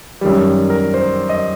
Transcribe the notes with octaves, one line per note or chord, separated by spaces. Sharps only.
F#2 D#3 G3
A#4
C5
D#5